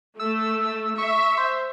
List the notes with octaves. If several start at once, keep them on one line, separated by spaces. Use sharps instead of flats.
A3 E6
E5 C#6
C5